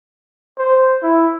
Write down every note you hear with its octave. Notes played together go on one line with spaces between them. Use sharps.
C5
E4